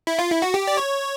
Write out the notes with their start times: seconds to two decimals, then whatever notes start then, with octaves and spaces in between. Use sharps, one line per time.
0.07 E4
0.19 F4
0.31 E4
0.42 F#4
0.54 G4
0.67 D5
0.77 C#5